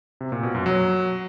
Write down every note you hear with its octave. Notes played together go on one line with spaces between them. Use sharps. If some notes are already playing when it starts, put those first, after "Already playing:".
C3
A#2
B2
F#2
F#3